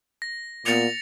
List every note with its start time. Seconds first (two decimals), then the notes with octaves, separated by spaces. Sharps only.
0.22 A#6
0.66 A#2 B3 A6 C#7 F7